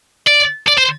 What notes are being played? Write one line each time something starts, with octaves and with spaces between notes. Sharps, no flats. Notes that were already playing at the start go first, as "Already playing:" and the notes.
D5
D5
C5